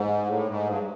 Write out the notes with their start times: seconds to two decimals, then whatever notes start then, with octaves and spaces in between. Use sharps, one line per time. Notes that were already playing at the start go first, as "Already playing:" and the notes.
Already playing: G#2
0.26 A2
0.47 G#2
0.67 G2